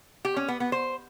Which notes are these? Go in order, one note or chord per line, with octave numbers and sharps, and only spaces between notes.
G4
C#4
B3
B3
C5